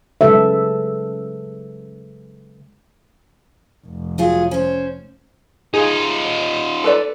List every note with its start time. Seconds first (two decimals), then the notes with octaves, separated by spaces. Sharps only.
0.21 C#3 F#3 G#3 A4 B4 E5
3.86 F1
4.18 F#3 F4 G#4
4.51 C#4 C5
5.74 D#4 F4 G#4
6.84 A4 B4 D5